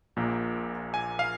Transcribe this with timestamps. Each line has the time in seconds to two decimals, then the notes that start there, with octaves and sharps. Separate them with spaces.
0.17 A#1 A#2 A#3
0.94 G#5
1.19 F5